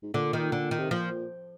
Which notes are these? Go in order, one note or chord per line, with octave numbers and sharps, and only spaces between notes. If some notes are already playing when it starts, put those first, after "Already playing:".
G#2
A#2 D3
D#3
D3
D#3
C3
A#2 F3